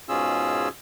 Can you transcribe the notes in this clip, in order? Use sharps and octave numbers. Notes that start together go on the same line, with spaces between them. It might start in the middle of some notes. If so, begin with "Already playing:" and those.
G#2 B2 C#4 F4 G#4 E6